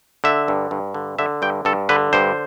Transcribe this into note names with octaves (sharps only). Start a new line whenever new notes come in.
D3 E5
G2
G2
D3
D3 E5
G2 G5
G2 A4
D3 B4
G2 C5